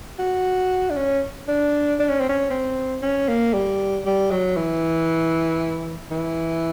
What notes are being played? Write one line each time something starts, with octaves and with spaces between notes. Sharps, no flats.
F#4
D4
C#4
D4
D4
C#4
C4
C#4
C4
C#4
A#3
G3
G3
F#3
E3
E3